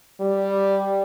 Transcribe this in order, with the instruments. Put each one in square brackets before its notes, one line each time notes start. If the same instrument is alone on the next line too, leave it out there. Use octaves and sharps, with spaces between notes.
[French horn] G3